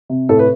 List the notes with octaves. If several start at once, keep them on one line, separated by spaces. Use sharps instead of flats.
C3
A2 A4
B4